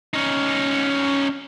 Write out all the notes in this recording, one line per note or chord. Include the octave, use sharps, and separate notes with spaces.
C#4 D#4